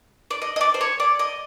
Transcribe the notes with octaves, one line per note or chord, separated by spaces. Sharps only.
D5
D#5
D#5
D5
C5
C#5
D5
D#5